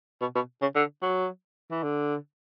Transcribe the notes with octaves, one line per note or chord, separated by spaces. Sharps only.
B2
B2
C#3
D3
F#3
E3
D3